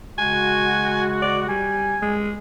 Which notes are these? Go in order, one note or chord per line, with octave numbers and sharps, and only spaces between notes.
C#3 G#3 F#4 G#5
D5
G3 G#5
G#3